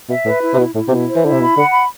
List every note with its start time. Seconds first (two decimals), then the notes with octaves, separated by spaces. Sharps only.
0.09 B2 E5
0.25 A2 B4
0.42 E4
0.53 C3
0.58 B2 E4
0.75 A2 E4
0.88 C3
0.91 B2 E4
1.08 C5
1.16 E3
1.24 D3 E4
1.32 C3
1.41 B2 B5
1.57 D3 F#5
1.73 B5